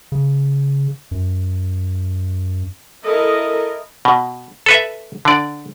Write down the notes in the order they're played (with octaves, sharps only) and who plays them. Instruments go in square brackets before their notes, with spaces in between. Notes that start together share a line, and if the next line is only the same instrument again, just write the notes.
[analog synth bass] C#3
F#2
[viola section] E4 A4 A#4 D#5
[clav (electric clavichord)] B2
A4 B4 E5
D3 D5